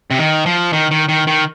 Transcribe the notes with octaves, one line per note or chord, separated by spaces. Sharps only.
C3
D#3
F3
D#3
D#3
D#3
D#3